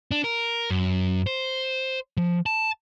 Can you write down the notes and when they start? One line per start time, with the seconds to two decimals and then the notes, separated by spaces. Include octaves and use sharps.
0.11 D4
0.24 A#4
0.70 F#2
1.27 C5
2.17 F3
2.46 A5